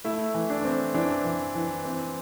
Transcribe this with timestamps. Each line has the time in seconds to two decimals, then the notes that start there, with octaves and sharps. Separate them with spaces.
0.04 A3 E4
0.34 E3
0.50 D4
0.65 C4
0.94 E3 D4
1.24 E3
1.55 E3
1.85 C4